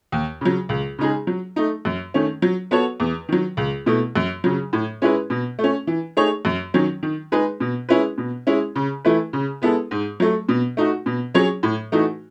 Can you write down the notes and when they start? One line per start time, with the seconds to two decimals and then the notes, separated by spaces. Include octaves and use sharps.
0.12 D#2
0.41 C#3 F#3
0.69 C#2
0.99 C#3 G#3 D#4 G#4
1.27 F#3
1.56 A3 D#4
1.85 F#2
2.14 D#3 A3 C#4
2.42 F#3
2.71 B3 F#4 A4 C#5
3.00 E2
3.29 D#3 F#3
3.57 C#2
3.86 B2 A3 E4
4.16 F#2
4.44 C#3 F#3
4.73 A2
5.02 G#3 C#4 E4 B4
5.30 B2
5.59 A3
5.64 C#4
5.87 E3
6.17 A3 D#4 G#4 C#5
6.45 F#2
6.74 D#3 F#3 C#4
7.03 D#3
7.32 G#3 D#4 G#4 B4
7.60 B2
7.89 G#3 C#4 E4 B4
8.18 B2
8.47 G#3 C#4 E4
8.76 C#3
9.05 E3 A3 E4 B4
9.33 C#3
9.62 G#3 B3 E4 A4
9.91 G#2
10.20 F#3 A3
10.49 B2
10.77 A3 D#4 F#4
11.06 B2
11.34 F#3 C#4 G#4 C#5
11.63 A2
11.92 E3 A3 D#4 F#4